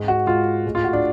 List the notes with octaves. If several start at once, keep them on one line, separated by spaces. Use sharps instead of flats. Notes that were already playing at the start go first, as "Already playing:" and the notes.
Already playing: G#2 G#3
F#4
G#2 G#3 F4
A2 G#3
F4
F#4
D4